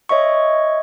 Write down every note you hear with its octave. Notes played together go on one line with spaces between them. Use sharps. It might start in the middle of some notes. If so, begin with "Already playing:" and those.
C#5 D#5 E5 C#6